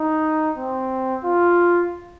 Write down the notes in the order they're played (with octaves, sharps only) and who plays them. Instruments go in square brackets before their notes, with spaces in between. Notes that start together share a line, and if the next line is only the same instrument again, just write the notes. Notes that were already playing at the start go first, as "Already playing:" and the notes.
Already playing: [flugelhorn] D#4
C4
F4